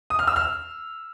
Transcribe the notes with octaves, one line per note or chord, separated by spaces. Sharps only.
D#6
F6
E6
F6